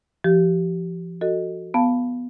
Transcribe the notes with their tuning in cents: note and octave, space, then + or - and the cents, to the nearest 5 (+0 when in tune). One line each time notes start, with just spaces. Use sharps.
F3 -25 G4 -25
F#4 +0 A4 +15 D#5 -5
B3 +0 F5 +0 A5 +0